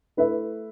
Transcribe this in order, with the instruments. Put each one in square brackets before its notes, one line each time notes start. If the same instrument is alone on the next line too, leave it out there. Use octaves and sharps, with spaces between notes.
[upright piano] A3 E4 B4 E5